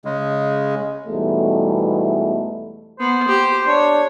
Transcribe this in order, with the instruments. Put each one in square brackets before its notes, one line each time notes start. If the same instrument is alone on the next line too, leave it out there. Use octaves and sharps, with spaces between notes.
[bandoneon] C#3 G#3
[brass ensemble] E2 G#2 B2 E3 G3 A3
[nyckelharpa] B3 [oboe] C5
[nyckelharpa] G4
[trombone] D4 [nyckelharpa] C#5